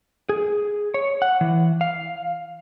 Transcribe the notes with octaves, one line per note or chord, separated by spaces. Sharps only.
G#4
C#5
F#5
E3
F5